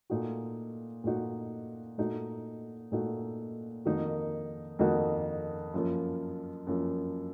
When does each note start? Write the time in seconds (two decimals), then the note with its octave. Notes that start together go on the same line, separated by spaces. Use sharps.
0.10 A#2 A3 D#4 F#4
1.04 A#2 A3 D#4 F#4
1.98 A#2 A3 D#4 F#4
2.92 A#2 A3 D#4 F#4
3.85 F2 D#3 A#3 D#4 F#4
4.79 F2 D#3 A#3 D#4 F#4
5.74 F#2 F3 A#3
6.67 F#2 F3 A#3